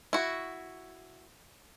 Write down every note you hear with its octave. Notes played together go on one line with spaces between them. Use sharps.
E4 F#4